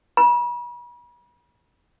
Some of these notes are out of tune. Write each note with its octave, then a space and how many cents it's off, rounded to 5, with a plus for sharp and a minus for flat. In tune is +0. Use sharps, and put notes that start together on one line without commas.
B5 -40